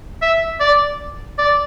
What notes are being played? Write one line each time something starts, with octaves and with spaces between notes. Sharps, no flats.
E5
D5
D5